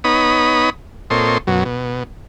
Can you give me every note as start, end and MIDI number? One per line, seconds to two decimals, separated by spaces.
0.04 0.70 59
0.04 0.70 63
0.04 0.70 73
0.04 0.70 83
0.04 0.70 87
1.10 1.38 46
1.10 1.38 60
1.10 1.38 69
1.10 1.38 73
1.10 1.38 75
1.10 1.38 84
1.47 1.64 42
1.47 1.64 47
1.47 1.64 54
1.65 2.03 47